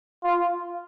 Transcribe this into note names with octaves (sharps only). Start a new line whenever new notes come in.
F4